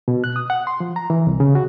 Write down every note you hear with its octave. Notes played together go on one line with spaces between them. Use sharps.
B2
F#6
D#6
F#5
C6
F3
A#5
E3
C2
C#3
F#4